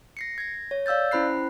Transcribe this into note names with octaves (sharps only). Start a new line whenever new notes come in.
A#6 C7 C#7
G#6 A#6
C#5
D5 F5 E6 G6 A6
C#4 E4 C5 B5 F#6 C7